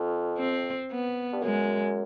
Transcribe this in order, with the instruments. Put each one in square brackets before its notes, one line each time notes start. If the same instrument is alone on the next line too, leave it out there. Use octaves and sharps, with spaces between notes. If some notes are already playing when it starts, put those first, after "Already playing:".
Already playing: [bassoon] F2
[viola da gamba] C4
B3
[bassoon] G2
[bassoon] F#2 [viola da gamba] G#3